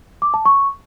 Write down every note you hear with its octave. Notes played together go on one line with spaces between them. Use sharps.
D6
A5
C#6